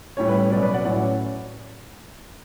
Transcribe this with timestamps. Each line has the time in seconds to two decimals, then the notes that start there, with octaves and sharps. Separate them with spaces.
0.17 A2 G3 C#4 C#5
0.29 B4
0.40 C#5
0.51 B2 F#3 C#4 B4 D5
0.62 B4 D5
0.74 D5 F#5
0.85 A2 F#3 C#4 D5 F#5